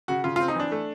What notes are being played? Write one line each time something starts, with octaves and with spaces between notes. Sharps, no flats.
C#3 F#4
C#3 F4
F4
C4
D#4
E3 D4
A3